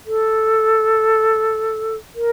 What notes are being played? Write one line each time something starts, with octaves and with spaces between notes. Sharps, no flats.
A4
A#4